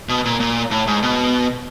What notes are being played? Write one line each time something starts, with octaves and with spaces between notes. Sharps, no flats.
B2
A#2
A#2
A2
G#2
B2